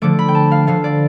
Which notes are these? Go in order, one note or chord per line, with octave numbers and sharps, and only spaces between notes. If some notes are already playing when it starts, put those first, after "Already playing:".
D3 F3 A3 D6
B5
G5
A5
F5
D3 F3 A3 F5
D5